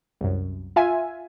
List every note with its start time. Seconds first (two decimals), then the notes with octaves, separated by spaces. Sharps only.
0.21 C2 F#2
0.76 F4 E5 G#5